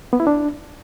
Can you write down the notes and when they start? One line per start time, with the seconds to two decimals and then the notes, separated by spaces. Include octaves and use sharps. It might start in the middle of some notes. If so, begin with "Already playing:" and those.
0.13 B3
0.20 E4
0.27 D4